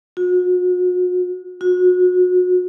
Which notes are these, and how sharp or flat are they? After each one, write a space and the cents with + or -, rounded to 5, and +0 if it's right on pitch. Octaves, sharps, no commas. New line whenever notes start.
F#4 -40
F#4 -30